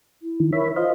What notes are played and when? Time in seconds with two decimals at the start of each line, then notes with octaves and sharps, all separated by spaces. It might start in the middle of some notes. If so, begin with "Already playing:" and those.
0.22 E4
0.40 D#3 E3
0.53 A#4 C#5 E5 B5
0.76 F4 C5 D#5 F5